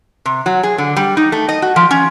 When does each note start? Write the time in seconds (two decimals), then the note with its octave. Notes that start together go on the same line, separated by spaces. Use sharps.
0.25 C3
0.46 F#3
0.63 G#4
0.78 D3
0.96 G3
1.17 D#4
1.32 A3
1.49 D#5
1.62 F#4
1.76 F3
1.91 C#4